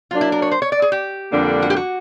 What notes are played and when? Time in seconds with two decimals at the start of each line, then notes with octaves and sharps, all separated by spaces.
0.11 F#3 A#3 D4 F4
0.21 E4
0.32 A#4
0.42 C#5
0.51 C5
0.62 C#5
0.72 D5
0.82 G#4
0.92 G4
1.32 F2 D3 G3 A#3 D4
1.62 F#4
1.70 G4
1.76 F#4